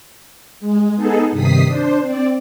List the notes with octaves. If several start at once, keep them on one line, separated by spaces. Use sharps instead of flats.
G#3
B3 D#4 G#4 A4
G2 C3 D#3 D#6 B6 C7
D4 C5
C4 D5